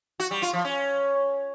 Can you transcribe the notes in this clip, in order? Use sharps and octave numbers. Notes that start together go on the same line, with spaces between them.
F#4
G3
F4
F3
C#4